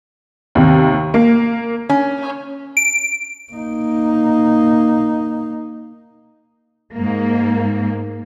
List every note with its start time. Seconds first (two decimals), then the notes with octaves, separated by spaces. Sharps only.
0.55 D#2 C3
1.14 A#3
1.89 C#4
2.77 D7
3.53 A#3 D#4
6.93 G#2 A#3